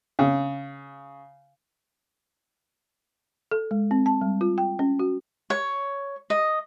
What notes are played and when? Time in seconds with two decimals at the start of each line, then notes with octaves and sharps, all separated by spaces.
0.19 C#3
3.51 A4
3.71 G#3
3.91 C4
4.06 A5
4.21 G3
4.41 F4
4.58 G5
4.79 C#4
4.99 F#4
5.50 C#5
6.30 D#5